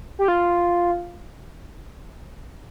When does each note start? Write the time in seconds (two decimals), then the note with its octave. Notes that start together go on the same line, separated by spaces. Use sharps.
0.19 G4
0.28 F4